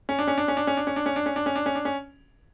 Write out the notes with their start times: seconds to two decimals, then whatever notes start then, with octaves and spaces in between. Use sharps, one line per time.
0.09 C#4
0.19 D4
0.27 C#4
0.38 D4
0.48 C#4
0.57 D4
0.67 C#4
0.77 D4
0.87 C#4
0.96 D4
1.06 C#4
1.16 D4
1.26 C#4
1.36 D4
1.46 C#4
1.55 D4
1.66 C#4
1.75 D4
1.85 C#4